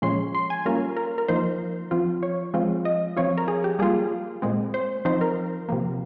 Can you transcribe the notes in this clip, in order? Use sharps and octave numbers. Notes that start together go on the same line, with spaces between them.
A#2 F3 G#3 C#4 C6
C6
G#5
G3 A#3 C#4 F4 A#4
A#4
A#4
F3 A#3 D#4 C5
F3 C4 F4
C#5
F3 G#3 C4 F4
D#5
F3 C4 F4 C#5
A#4
G#4
G4
G3 A#3 F4 G#4
A#2 G#3 C4
C5
F3 C4 D#4 C5
A#4
C3 F3 A#3